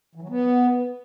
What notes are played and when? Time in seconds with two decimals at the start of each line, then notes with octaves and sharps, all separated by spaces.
0.15 E3
0.22 F#3
0.29 B3